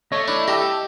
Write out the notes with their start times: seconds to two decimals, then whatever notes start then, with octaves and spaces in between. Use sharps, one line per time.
0.12 A3 C#5 D#5
0.28 D4 E4
0.48 G4 D#5 A5 E6